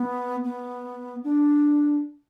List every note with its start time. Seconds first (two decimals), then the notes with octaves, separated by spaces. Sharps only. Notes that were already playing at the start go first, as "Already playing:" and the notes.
Already playing: B3
0.44 B3
1.24 D4